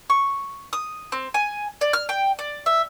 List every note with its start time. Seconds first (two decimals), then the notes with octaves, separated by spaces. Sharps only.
0.10 C#6
0.73 D#6
1.12 C4
1.34 G#5
1.81 D5
1.93 F6
2.09 G5
2.39 D5
2.66 E5